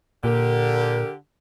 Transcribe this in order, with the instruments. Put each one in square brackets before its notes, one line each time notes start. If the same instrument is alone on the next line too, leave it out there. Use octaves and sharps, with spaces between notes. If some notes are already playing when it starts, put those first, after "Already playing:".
[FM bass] A#2 [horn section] D3 G4 [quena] A#4